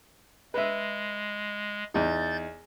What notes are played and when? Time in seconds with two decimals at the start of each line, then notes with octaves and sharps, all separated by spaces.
0.54 G#3 B4 E5
1.94 E2 D#4 G6 A6